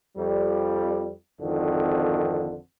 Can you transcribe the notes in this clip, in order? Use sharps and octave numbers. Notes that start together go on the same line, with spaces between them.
F2 G3
G#1 F2 D3 D#3